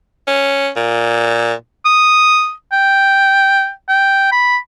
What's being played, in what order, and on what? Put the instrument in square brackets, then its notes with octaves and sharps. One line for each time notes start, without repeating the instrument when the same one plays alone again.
[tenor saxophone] C#4
A#2
[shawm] D#6
G5
G5
B5